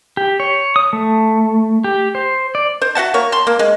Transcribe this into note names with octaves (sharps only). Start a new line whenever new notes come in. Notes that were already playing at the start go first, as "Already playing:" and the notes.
G4
C#5
D#6
A3
G4
C5
D5
C5
F#4 E5 F#5 A5
A#3 C#5
A5 C6
A#3
G#3